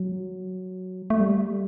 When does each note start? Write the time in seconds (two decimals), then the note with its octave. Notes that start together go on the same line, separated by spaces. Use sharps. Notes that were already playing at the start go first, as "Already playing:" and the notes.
Already playing: F#3
1.10 A3
1.20 G3